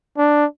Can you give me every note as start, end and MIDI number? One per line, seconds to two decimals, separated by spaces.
0.17 0.46 62